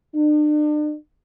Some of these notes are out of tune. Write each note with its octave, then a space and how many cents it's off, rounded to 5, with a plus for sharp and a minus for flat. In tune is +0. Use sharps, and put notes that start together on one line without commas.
D4 +40